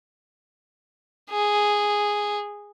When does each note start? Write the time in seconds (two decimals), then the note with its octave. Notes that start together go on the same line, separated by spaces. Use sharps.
1.30 G#4